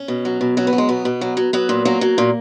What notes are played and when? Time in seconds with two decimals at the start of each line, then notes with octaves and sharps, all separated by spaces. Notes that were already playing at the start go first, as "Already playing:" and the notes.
Already playing: C#4
0.08 B2
0.25 F#3
0.41 B2
0.57 F#3 C#4
0.67 B3
0.73 F#3
0.78 G#3
0.89 B2 B3
1.05 B2
1.21 F#3
1.37 F#3
1.53 F#3 B3
1.69 A#2
1.85 F#3 A#3
2.01 F#3
2.18 A#2